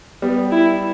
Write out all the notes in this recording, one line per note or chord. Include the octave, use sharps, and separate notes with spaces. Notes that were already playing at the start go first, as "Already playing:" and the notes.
G3 B3
E4